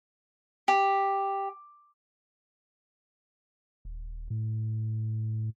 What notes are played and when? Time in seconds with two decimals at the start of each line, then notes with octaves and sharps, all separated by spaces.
0.68 G4
3.85 D#1
4.30 A2